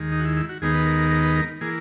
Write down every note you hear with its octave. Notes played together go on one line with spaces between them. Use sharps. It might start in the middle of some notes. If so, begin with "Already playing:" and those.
Already playing: D#2 D#3 G#3
D#4
F#4
E4
E4
F#4
D#2 D#3 G#3 B3 D#4 G#4
B4
A#4
A#4
A#4
B4
A#4
E3 A#3 G#4